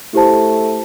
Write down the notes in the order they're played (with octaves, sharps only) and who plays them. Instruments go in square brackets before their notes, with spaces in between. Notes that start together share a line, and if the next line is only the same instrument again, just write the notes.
[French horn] A3 [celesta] E4 G4 C5 A5